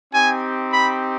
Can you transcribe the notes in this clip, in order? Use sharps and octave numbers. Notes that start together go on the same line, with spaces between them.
C4 D#4 G4 G#5
B5